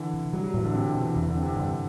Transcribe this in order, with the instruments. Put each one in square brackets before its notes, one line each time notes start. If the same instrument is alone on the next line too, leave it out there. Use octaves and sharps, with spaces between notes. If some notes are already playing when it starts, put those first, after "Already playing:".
Already playing: [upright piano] D3 E3
[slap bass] C3
[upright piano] F#3 [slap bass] G3
[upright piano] F#3
[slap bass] A2 [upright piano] E3
[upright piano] D3
[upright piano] C3 [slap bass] C4
[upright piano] D3
[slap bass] B2
[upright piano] E3
[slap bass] E2 [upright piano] E3
[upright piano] D3
[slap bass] C4
[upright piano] C3
[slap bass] G2 [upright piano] D3